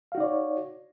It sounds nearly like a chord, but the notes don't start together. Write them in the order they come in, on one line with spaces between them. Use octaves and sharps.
F5 F#4 D#4 D5 C#5